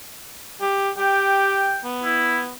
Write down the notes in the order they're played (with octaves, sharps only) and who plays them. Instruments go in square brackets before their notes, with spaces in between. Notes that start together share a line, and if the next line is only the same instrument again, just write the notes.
[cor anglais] G4
[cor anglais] G4 [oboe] G5
[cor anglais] B3
[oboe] E4